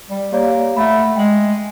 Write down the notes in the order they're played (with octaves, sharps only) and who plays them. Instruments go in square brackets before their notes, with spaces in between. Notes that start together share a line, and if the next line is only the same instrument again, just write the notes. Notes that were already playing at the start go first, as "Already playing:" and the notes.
[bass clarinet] G3
[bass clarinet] A#3 [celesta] G4 C#5 D5
[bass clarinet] A3 [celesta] E5 F#5 B5
[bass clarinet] G#3 [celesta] G5 F#7